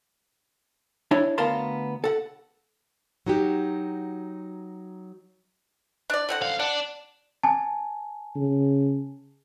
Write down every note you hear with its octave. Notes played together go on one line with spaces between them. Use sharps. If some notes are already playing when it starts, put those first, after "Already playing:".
D4 E4 C#5
D2 B3 A#4 F5 A5 C6
A4 F#5
F#3 D#4 F#4 G4
D4 D5
D3 C4 F#5
F#2 F5
D4 F#5
G#5 A5
C#3